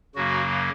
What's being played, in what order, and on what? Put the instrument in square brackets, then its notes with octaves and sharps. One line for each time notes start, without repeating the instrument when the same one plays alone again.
[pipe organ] F#2 C#3 F#3 A#3 F#4